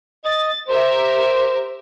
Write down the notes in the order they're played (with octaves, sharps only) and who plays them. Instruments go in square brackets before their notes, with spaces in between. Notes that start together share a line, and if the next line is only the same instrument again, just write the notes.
[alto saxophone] D#5 [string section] A6
[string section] G4 A#4 E5 [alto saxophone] C5